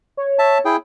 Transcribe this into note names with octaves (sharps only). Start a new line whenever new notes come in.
C#5
E5 A5
E4 G#4 G5